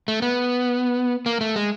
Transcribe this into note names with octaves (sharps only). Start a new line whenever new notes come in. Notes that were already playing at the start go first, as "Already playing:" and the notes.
A3
B3
A#3
A3
G#3